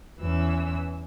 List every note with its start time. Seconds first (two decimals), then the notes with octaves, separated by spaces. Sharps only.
0.19 E2 E3 C#4 E6